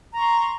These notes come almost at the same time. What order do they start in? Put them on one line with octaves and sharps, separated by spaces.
A#5 C#6 C6